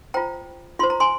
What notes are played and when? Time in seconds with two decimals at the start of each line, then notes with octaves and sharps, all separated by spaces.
0.14 F4 C5 G5 A#5
0.79 F4 C5 C6
0.90 A#5
1.00 G#5 C6